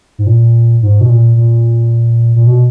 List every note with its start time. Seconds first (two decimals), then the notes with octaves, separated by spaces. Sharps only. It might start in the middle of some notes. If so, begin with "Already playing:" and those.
0.18 G#2
0.27 A#2
0.83 G#2
1.01 B2
1.09 A#2
1.36 A#2
2.36 A#2
2.47 B2